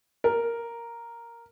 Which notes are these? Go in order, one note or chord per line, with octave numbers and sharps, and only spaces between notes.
A#4